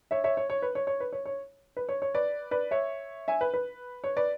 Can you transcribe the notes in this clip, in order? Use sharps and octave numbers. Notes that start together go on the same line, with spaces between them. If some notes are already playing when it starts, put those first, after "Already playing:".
C#5 E5
C#5 E5
C#5
C#5
B4
C#5
C#5
B4
C#5
C#5
B4
C#5
C#5
B4 D5
B4 D5
C#5 E5
E5 G#5
B4
B4
C#5
B4 D5